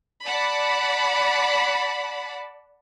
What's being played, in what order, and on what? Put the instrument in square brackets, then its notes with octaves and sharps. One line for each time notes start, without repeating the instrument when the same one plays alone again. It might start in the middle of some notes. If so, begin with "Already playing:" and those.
[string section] D5 F#5 A5 B5